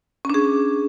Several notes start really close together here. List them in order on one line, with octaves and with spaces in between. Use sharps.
C#4 D4 G#4